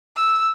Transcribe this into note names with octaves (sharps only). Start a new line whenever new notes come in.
E6